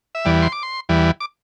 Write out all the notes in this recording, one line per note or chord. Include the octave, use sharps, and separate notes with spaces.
E5
E2 E3 G3 D5
C6
D6
C6
E2 E3 G3
D6